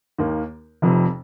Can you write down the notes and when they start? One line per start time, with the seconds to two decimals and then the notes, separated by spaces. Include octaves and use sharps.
0.18 D#2 D#3 A#3
0.82 F1 F2 C3